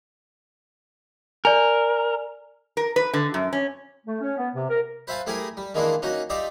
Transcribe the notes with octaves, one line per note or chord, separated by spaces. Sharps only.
A#4 D5 G#5
A#4
B4
D3
F#2
C#4
A3
C#4
B3
C3
A#4
B4 C5 E5 F5 G#5 A5
A3 E4 G4 G#4 A#4 G#5
G3
D#3 E3 G#3 A#3 D4 E4
A#3 C#4 D#4 F#4
D#4 F4 G4 D5 E5 C6